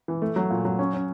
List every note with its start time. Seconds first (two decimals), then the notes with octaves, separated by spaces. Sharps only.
0.08 E3
0.22 A3
0.36 F#3
0.50 A#2
0.65 F#3
0.79 C#4
0.94 C#4